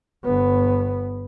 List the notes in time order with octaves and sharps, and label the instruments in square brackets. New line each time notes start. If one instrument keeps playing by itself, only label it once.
[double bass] G1 B3